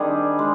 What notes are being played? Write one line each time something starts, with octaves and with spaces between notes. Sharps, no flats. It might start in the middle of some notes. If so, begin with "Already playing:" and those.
Already playing: D#3 G3 C4 D4 G#4
G#3